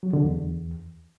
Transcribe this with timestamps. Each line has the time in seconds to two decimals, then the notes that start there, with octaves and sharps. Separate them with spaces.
0.03 F#3
0.13 D3
0.24 E2